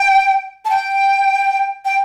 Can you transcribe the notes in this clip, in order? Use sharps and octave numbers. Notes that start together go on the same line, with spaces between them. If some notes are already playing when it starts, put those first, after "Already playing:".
Already playing: G5
A5
G5
G5